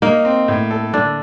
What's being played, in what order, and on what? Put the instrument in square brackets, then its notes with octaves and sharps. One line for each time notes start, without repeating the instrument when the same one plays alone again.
[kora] A#3 [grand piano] D#4
[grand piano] C4
A2
A4
[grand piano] D3 [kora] D4